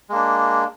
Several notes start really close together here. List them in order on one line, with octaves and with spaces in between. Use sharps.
G#3 A#3 D4